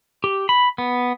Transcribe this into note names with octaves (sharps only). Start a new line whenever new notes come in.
G4
B5
B3